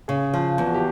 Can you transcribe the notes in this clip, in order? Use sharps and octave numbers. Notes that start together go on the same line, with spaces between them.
C#3 G#4
F3
E2
F#4
G4